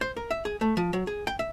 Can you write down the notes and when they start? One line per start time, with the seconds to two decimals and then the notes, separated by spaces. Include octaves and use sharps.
0.01 C5
0.17 A#4
0.31 E5
0.45 G#4
0.61 A3
0.77 F3
0.93 F#3
1.07 G#4
1.27 G5
1.39 E5